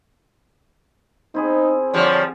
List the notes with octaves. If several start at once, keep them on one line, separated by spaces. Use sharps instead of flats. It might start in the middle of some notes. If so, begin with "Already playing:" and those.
C4 D#4 E4 G#4
D3 F3 G3 C#5 D5